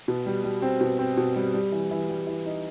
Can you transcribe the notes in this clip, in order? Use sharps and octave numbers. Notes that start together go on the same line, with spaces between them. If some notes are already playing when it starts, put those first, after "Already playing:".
B2
G3
G3
C4
B2
C4
B2
G3
G3
E3
E3
G3
E3
D#4